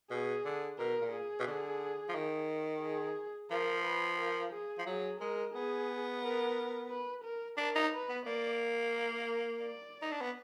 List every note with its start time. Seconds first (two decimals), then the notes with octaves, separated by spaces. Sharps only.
0.11 B2 G#4
0.45 D3
0.79 B2 A#4
1.01 A#2
1.12 G#4
1.40 B2
1.47 D3
2.09 F3
2.15 D#3
2.82 G#4
3.51 F3 A#4
3.84 B4
4.19 A#4
4.53 G#4
4.79 F3
4.86 F#3 G#4
5.20 G#3 A#4
5.54 B3 G#4
6.22 A#4
6.90 B4
7.24 A#4
7.58 D4 A#4
7.76 D#4
7.92 B4
8.09 B3
8.26 A#3 D5
8.94 A#4
9.62 D5
10.02 D#4
10.12 D4
10.21 B3